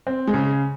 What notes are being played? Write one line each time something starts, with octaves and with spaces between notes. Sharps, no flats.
C4
G#3
C#3